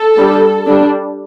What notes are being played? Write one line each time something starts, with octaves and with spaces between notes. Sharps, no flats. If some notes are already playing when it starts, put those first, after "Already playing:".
Already playing: A4
G3 D4
G3 D4